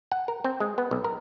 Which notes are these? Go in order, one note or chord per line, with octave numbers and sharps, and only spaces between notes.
F#5
A#4
C4
G#3
B3
B1
A#4